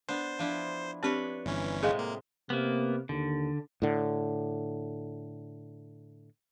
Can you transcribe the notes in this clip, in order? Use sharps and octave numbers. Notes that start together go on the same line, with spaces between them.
B3 D4 C5
F3 D4 E4
C4 D4 G4 B4 C#5
G1 E3 C#4
A2 C3 G#3 G#4 D#5 F5
A#3
C3 A#3 B3
D#2 D3
A2 D3